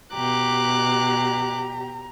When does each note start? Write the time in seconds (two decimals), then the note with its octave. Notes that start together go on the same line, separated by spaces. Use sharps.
0.15 B2 G4 A#5 D6 F#6